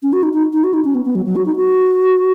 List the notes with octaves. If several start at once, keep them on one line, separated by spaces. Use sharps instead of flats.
C#4
F#4
D#4
D#4
D#4
F#4
D#4
C#4
B3
B3
F#3
F#3
F#4
D#4
F#4